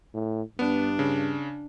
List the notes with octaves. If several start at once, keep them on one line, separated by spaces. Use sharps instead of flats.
A2
G2 B3 D4
C#3